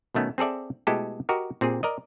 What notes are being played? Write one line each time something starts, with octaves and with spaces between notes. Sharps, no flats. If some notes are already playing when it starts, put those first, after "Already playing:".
B2 D#3 A3 B3 C#4
C4 G#4 A4 D5 E5
B2 G#3 A3 E4 G4 A4
F#4 G4 A#4 D#5
A#2 C4 G4 G#4
A#4 D5 D#5